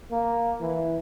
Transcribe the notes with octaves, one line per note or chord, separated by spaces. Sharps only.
A#3
E3